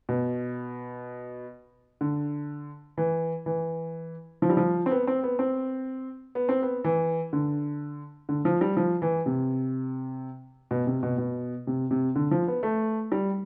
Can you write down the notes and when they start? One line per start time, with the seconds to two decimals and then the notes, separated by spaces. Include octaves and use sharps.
0.09 B2
2.01 D3
2.98 E3
3.46 E3
4.42 F3
4.50 G3
4.57 F3
4.86 C4
4.91 B3
5.07 C4
5.23 B3
5.39 C4
6.35 B3
6.49 C4
6.62 B3
6.84 E3
7.33 D3
8.29 D3
8.45 F3
8.61 G3
8.77 F3
9.02 E3
9.26 C3
10.71 B2
10.87 C3
11.03 B2
11.18 B2
11.67 C3
11.91 C3
12.15 D3
12.31 F3
12.48 B3
12.63 A3
13.12 G3